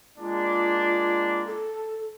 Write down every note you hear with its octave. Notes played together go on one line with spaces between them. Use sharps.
G#3 A#3 D4 F4
A4